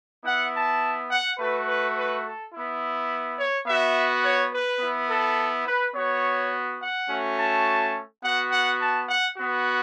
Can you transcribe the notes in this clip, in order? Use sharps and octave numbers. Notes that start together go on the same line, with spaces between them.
B3 E4 F#5
A5
F#5
A3 F#4 B4
B4
B4
A4
E4
B3
C#5
B3 F#4 E5
C#5
B4
B3 E4
A4
B4
B3 F#4 C#5
F#5
A3 C#4 F#4
A5
B3 F#4 F#5
F#5
A5
F#5
B3 F#4